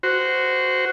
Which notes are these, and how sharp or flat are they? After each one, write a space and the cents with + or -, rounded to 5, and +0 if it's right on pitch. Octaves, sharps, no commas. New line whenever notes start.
F#4 +0 C5 -15